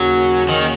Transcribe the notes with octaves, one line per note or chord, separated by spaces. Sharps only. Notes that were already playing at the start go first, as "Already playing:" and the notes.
Already playing: D#2 C#3 F#3 A#3 C#4 F#4
D#3